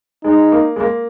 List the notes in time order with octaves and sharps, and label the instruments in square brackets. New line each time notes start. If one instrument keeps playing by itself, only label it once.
[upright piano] G#3 [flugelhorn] D#4
[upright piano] A#3
G#3
A#3